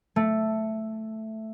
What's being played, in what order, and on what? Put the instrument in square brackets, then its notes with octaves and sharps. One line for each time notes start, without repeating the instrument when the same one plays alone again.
[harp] A3